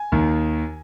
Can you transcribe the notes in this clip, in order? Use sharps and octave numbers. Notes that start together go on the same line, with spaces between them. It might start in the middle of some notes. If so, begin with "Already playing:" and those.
Already playing: G#5
D#2 D#3